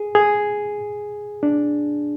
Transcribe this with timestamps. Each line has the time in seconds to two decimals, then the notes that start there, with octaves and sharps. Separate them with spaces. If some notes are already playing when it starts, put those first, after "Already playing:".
Already playing: G#4
0.15 G#4
1.43 D4